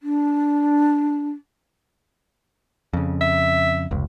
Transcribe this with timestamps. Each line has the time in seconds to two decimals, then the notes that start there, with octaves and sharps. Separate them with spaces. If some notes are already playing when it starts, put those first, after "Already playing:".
0.02 D4
2.93 F2 C#3
3.21 E5
3.91 F1 C#2